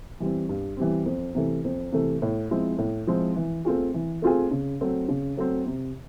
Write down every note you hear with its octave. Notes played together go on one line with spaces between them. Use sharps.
E3 G3 C4
G2
E3 G3 C4
F2
C3 E3 A3
F2
C3 E3 A3
A2
F3 G#3 C4 E4
A2
F3 G#3 C4 E4
E3
A3 C4 F4 G#4
E3
A3 C4 F4 G#4
C#3
F#3 A3 C4
C#3
F#3 A3 C4
C3